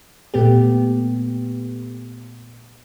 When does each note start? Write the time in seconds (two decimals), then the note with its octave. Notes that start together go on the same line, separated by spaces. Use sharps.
0.34 A#2 A3 B3 G4